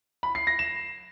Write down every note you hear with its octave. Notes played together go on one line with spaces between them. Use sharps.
B5
C7
A#6
E7